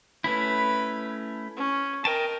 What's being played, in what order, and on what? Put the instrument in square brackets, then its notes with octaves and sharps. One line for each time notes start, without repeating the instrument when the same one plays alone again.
[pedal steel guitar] A3 C#4 E4 [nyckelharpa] B4 B5
[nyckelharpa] C#4
[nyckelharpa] A#4 [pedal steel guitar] D#5 G5 A5